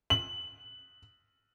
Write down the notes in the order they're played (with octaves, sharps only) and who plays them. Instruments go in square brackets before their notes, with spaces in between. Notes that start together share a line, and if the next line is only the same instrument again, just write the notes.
[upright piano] F#7